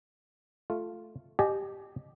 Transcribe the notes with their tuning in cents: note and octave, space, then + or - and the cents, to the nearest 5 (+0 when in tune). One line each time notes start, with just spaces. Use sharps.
A3 -5 F4 +0
G4 +0 D#5 -30 G#5 +30